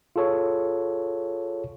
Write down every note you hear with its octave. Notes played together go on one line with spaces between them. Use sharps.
F4 G#4 A4 C#5